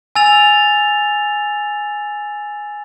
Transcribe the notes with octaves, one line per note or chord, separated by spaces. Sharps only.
G#5 E6 A6 F7